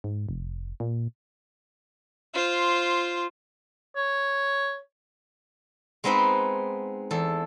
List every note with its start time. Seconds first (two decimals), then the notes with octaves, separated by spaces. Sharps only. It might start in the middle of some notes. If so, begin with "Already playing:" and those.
0.04 G#2
0.29 F1
0.80 A#2
2.34 F4 C5
3.96 C#5
6.04 G#3 B3 C4 D#4 B4
7.11 E2 A4